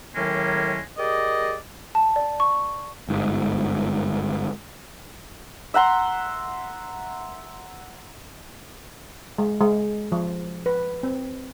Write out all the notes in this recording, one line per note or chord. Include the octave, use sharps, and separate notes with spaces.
A2 D#3 F#3 G#3 A#3 C#4
G4 G#4 A#4 D5 D#5
A5
D5
C#6
G1 G#2
E5 F#5 A#5 C6
G#3
G#3
F3
B4
C4